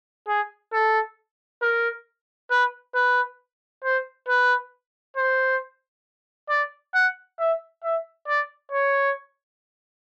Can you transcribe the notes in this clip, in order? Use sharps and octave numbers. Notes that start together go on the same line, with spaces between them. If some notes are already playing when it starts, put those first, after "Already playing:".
G#4
A4
A#4
B4
B4
C5
B4
C5
D5
F#5
E5
E5
D5
C#5